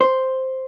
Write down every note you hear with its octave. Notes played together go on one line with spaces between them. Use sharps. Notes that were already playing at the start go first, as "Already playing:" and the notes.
C5